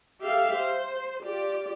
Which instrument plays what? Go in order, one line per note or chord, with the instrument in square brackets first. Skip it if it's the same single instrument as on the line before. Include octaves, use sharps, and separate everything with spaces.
[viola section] G4 A4 E5 F5
C5
F4 G4 D5